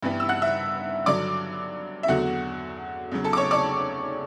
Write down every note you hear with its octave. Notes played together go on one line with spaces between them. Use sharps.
G2 E3 G3 B3
E6
F#5 F#6
E5 E6
G2 D3 F#3 D5 D6
E5
E2 D3 F#3 A3 F#4 F#5
E2 C#3 F#3
A4 A5
D6
C#5 C#6
D5 D6